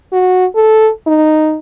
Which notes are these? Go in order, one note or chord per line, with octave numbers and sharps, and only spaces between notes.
F#4
A4
D#4